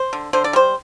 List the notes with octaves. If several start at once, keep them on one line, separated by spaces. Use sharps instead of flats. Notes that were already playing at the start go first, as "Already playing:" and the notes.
Already playing: C5
D3
D3 C5
D5
G3 C5